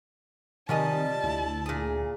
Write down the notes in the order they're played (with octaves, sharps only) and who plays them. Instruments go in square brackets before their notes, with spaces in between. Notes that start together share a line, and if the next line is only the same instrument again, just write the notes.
[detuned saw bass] C3 [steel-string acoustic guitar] D#3 G#5 [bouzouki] F3 G3 D#5 [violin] A5
[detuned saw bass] D2 [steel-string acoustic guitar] E4
[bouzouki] A#2 G#4